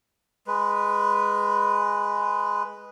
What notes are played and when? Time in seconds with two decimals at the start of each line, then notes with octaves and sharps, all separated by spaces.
0.47 G#3 B4